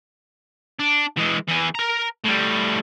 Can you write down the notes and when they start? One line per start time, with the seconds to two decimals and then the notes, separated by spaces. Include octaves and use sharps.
0.80 D4
1.17 E3 G#3
1.48 E3 G#4
1.75 A#4 A#5
2.24 A2 G3